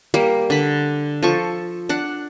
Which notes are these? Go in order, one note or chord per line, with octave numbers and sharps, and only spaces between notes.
G3 A#3
D3 B5
F3 A4 C#6
D4 F#5